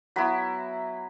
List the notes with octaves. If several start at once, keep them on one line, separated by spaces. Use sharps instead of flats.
F#3 B3 E4 B5